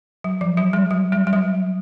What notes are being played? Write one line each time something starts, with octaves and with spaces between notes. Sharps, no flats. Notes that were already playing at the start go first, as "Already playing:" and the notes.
F#3
F3
F#3
G3
F#3
G3
G3
F#3